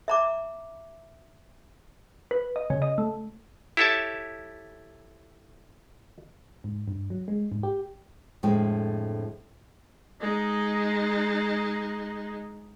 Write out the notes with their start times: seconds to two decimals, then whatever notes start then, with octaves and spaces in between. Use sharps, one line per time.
0.08 E5 A#5 D6
2.31 B4
2.56 D#5
2.70 C#3
2.82 D#5
2.98 A3
3.77 E4 G4 A4 C#5 E5 A5
6.64 G#2
6.88 G2
7.10 F#3
7.28 G#3
7.52 G#2
7.63 G4
8.43 F2 A2 D3 G#3 G5
10.21 G#3 D#4